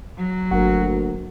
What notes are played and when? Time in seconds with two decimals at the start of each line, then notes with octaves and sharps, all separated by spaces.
0.17 F#3
0.51 G1 D2 A#3 F#4 A#4